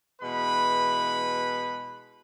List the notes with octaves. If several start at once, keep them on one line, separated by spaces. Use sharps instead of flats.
B2 E3 G#3 B4 B5